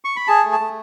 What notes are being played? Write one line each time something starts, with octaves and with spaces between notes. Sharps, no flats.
C#6
B5
G#4 A5
A3
A5
A3